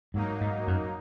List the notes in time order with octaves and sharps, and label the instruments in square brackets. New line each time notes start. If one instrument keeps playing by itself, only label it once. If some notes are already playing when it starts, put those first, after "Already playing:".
[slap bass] G#2 [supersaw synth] F#3 A#3 D#4
[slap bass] G#2
F#2